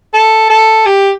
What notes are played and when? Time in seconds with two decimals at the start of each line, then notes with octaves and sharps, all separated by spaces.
0.14 A4
0.50 A4
0.86 G4